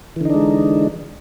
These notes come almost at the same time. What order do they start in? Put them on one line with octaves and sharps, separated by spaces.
E3 D3 D#4 D4 G#3